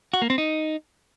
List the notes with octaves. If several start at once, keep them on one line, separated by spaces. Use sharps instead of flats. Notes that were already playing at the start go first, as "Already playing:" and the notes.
F#4
A#3
C4
D#4